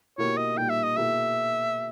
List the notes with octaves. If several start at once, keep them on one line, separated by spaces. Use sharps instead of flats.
B2 A#3 E4 G4 A#4 C#5
D#5
A#2 G3 A#3 D#4 G5
E5
D#5
B2 A#3 E4 G#4 E5